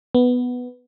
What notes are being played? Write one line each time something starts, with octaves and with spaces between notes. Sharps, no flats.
B3